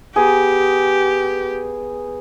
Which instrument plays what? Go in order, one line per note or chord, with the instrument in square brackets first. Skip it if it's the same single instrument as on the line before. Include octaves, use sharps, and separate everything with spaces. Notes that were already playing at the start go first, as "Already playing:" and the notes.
[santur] B3 G#4 [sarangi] G4